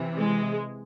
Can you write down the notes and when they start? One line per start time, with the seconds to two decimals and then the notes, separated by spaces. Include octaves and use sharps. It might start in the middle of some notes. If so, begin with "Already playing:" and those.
Already playing: C3 E3
0.18 G#3